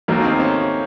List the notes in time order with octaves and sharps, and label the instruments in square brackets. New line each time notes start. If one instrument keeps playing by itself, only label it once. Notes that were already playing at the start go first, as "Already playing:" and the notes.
[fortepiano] D#2 D#3 F#3 A3 D#4 [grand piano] A#3
[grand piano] C4
C#4